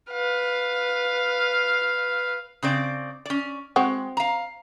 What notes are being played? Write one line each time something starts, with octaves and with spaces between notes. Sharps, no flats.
B4 F5
C#3 C4 D5
C#4 D5
G#3 C4 F#4
F5 A#5